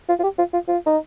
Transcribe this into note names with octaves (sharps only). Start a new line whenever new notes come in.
F4
F4
G4
F4
F4
F4
D#4